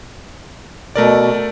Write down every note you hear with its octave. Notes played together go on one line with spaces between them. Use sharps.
B2 A3 A#4 D5